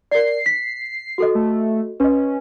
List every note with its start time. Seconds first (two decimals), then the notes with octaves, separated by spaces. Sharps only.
0.11 A#4 D5 C7
0.46 B6
1.18 F#4 A4 D#5
1.35 A3
2.00 C#4 B4 D#5